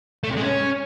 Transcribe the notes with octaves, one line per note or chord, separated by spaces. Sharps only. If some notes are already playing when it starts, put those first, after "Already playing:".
A3
C3
G#3
C#4